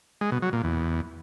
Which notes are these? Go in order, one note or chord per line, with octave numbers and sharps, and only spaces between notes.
G#3
B2
F#3
A#2
E2